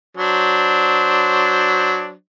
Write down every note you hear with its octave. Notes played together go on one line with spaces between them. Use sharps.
F#3 D4 C5